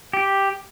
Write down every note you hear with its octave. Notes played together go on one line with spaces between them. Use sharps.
G4